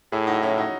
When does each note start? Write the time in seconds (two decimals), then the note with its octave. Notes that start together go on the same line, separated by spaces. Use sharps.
0.12 A2 E4 G#4
0.27 D#4 F#4
0.42 C#4 E4
0.57 D#4 F#4